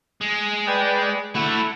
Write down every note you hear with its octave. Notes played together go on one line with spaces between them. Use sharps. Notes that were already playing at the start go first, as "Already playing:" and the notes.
G#3
B4 D5 G5
A3 E4 F#4 F#5